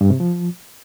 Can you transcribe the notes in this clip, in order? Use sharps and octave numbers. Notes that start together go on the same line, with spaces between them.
G2
C3
F3